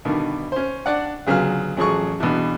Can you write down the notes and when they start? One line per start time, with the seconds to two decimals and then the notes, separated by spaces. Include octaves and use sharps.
0.05 G2 B2 D3 D#3
0.52 C#4 C5
0.86 D4 D5 F#5
1.27 D2 C#3 F#3 B3 F4 F6
1.77 A1 F3 F#3 G#4 C#6
2.20 E2 G2 B2